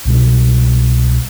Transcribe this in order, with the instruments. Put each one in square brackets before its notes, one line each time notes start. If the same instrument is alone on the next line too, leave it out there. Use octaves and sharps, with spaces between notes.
[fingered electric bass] C2 B2 G3